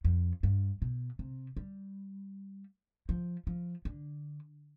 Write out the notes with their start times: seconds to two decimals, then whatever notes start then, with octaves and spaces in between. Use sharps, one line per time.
0.04 F2
0.43 G2
0.82 B2
1.19 C3
1.57 G3
3.09 F3
3.47 F3
3.85 D3